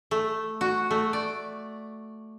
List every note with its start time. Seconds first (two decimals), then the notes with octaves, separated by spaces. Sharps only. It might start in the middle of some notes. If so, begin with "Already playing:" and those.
0.11 A3
0.61 F#4
0.91 A3
1.13 D5